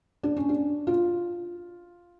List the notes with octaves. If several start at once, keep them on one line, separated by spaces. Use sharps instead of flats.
D4
C#4
D4
F4